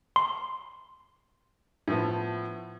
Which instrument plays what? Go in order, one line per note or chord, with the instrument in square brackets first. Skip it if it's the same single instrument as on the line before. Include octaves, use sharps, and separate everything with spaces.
[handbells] C6
[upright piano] A2 F3 B3